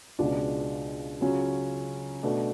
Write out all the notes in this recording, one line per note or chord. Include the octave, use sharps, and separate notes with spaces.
C#2 B2 G#3 D4 F4
C#3 F#3 C#4 F4
B2 A3 D4